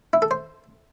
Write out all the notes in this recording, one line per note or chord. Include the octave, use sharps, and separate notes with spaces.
E4
A4
C5